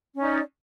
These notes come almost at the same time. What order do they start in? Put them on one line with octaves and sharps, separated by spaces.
C#4 D#4 D5